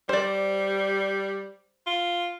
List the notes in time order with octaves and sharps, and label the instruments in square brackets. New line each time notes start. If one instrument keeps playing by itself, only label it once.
[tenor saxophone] G3 [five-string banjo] C5 D5
[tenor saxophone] F4